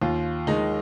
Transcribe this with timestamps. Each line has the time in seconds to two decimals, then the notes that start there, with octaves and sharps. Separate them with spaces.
0.01 D#2 F4
0.47 D#3 G#3 D#4